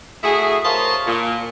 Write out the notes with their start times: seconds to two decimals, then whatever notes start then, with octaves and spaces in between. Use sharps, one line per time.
0.23 A3 E4 F#4 G#4
0.65 A#4 C5 C#5 D#5 F5 A5
1.06 A#2